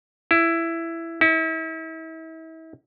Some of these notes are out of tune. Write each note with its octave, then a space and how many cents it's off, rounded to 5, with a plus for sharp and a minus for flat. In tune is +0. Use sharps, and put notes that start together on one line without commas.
E4 +10
E4 -40